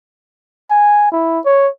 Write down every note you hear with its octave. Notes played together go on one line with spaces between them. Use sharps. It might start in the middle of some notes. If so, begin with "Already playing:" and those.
G#5
E4
C#5